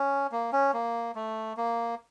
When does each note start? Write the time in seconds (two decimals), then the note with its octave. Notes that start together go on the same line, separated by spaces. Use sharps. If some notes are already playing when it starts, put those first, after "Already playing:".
Already playing: C#4
0.32 A#3
0.53 C#4
0.74 A#3
1.15 A3
1.57 A#3